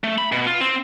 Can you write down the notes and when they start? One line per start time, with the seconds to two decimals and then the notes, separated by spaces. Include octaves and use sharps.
0.04 A3
0.18 B5
0.32 B2
0.47 F4
0.61 C4